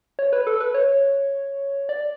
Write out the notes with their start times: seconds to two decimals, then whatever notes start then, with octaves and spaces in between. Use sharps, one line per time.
0.19 C#5
0.33 B4
0.47 A4
0.60 B4
0.74 C#5
1.89 D5